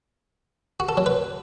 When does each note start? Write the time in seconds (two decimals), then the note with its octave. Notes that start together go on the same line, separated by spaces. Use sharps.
0.80 F#4
0.89 A4
0.97 F#3
1.06 B4